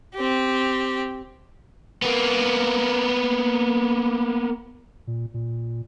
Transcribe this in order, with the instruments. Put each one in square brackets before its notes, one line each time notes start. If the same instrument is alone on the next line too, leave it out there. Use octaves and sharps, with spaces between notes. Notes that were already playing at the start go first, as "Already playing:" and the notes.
[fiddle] C4 G4
[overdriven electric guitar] A#3 B3
[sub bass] A#2
A#2